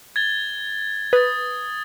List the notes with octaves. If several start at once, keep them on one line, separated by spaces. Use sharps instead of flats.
G#6 A6 G7
B4 D#6 A6